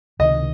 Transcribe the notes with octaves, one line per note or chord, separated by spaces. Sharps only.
C#2 C3 D#3 D#5